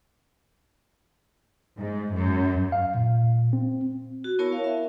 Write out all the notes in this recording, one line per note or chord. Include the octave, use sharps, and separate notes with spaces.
G#2
F#2
F5
A#2
C4
F#4
B3 E4 A#4 C#5 A5 C#6
F5
E5